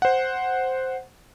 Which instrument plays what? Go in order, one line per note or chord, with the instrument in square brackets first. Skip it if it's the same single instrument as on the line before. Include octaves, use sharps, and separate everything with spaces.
[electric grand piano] C5 F#5